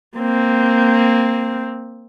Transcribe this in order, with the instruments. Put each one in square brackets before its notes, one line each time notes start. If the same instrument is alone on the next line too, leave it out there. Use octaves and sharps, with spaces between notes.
[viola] A#3 C4